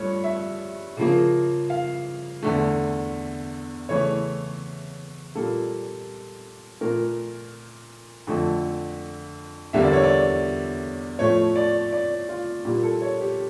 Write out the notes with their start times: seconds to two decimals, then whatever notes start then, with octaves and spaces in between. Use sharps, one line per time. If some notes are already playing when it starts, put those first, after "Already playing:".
Already playing: G2 F3 A3 C#5
0.24 E5
0.97 C#3 F3 A#3
1.70 F5
2.42 E2 D3 A3
3.89 C#3 E3 A3 C#5
5.35 A#2 G3 A#3 A4
6.81 A#2 A3 A#4
8.27 F2 D3 A3
9.73 E2 D3 G3 A#3 E5
9.83 D5
9.93 C#5
10.03 D5
11.19 A2 F3 A3 C#5
11.56 D5
11.93 D5
12.29 F4
12.65 A#2 G3 A#3
12.83 A4
13.02 C#5
13.20 G4